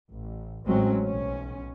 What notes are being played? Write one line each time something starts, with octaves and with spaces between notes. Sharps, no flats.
A1
A1 A2 F#3 G#3 C4 C#4
B1 C#4